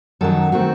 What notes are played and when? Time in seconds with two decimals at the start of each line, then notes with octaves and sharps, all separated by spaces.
0.21 F#2 D#3 F#3 A4
0.52 D#3 A3 C4 F#4